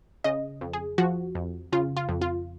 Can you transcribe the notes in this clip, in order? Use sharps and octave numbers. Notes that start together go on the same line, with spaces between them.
C#3 D#5
F2
G#4
F3 F#4
F2
C#3 F4
F4
F2
F4